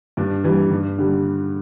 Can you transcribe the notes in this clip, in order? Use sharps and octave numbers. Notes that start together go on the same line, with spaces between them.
G2 D4
E3 G3
G2
D3 G3